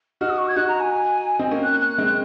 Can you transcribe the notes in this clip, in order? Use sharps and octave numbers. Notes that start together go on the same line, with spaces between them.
D#4 F#4 F6
D#6
C#6
G#6
D#4 F#4 F#6
A#5
G#5
C4 D#4
A#3 C#4
F#6
F#6
G#3 C4